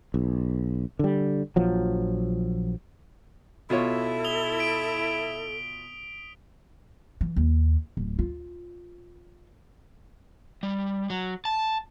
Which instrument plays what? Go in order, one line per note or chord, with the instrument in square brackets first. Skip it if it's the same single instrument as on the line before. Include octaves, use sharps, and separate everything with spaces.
[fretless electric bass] B1
D3 G3
A#1 F3 F#3
[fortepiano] B2 F4 C#5 [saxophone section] E4 [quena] A4
[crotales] D#6 F7 G7
B6 D7
[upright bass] E3
D#2
D1
F4
[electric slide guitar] G3
F#3
A5